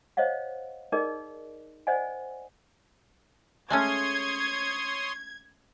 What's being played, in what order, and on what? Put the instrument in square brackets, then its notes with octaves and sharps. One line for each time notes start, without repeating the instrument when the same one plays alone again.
[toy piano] C5 C#5 D#5 F5 F#5
D#4 G#4 A#4 D5 D#5
C5 D5 D#5 F#5 G#5
[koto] G#3 A3 C#4 [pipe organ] C#5 C6 D#6 [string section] G#6